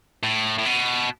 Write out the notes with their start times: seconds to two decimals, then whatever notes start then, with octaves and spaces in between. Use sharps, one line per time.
0.23 A2
0.58 A2
0.65 B2